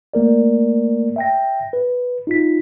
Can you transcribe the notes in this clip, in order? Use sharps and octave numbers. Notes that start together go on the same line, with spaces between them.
A3 A#3 A#4 D5
E5 G5 A#6
B4
D#4 F4 B6